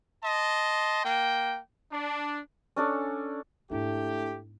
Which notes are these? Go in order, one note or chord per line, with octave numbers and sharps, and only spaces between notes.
D#5 A5 C6
A#3 G5
D4
C#4 D4 A4 C#5
G#2 A3 B3 D4 E4 G4